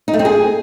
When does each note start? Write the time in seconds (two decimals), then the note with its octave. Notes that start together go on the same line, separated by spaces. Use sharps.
0.08 D#4
0.14 A3
0.19 C4
0.25 G#4